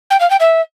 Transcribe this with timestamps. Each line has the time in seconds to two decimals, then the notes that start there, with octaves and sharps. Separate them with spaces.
0.10 G5
0.20 F5
0.30 G5
0.40 E5